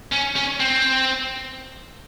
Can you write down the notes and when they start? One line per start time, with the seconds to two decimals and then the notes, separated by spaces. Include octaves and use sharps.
0.13 C#4
0.36 C#4
0.60 C4